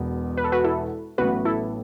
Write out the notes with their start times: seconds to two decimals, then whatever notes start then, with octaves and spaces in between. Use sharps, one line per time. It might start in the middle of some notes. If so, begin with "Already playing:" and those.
Already playing: E1 E2 B2 B3
0.37 B4
0.44 A4
0.52 F#4 B4
0.64 E4 A4
1.18 A1 A2 F#3 B3 F#4 B4
1.45 E4 A4